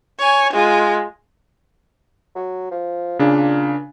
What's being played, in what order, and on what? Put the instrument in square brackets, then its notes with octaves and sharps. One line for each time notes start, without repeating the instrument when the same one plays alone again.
[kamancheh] C#5 G#5
G#3 F4
[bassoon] F#3
F3
[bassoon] A#2 [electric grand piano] C#3 D4